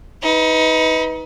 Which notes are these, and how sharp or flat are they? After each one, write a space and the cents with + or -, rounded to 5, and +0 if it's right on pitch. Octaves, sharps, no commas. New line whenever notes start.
D#4 +30 B4 +0